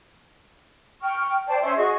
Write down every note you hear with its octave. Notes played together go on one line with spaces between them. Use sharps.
G5 C#6 F6
C5 D5 G5 A5
C#4 C5 E5 C6
F#4 G#4 D#5 C#6